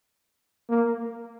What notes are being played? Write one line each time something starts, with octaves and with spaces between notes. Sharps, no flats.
A#3